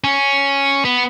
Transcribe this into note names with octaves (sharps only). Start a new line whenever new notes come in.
C#4
B3